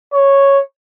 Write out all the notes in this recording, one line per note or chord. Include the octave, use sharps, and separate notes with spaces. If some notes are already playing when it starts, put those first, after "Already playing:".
C#5